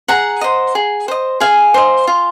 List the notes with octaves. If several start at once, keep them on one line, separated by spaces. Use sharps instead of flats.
G#4 F#5 A#5
C5 D#5
G#4
C5 D#5
G#4 F5 G#5
C5 D#5
F4